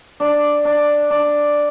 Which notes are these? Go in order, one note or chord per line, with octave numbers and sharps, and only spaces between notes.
D4
D4
D4